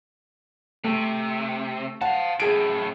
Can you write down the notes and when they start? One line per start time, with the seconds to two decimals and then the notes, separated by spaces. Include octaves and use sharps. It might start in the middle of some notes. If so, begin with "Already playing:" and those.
0.84 C3 A3
2.01 F5 F#5 A5
2.40 F#2 A2 G#4 D7